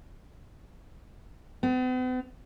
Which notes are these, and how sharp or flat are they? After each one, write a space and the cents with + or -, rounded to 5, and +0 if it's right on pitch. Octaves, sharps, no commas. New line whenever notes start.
B3 +45